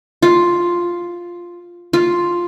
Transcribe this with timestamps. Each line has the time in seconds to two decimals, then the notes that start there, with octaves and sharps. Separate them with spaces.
0.22 F4
1.93 F4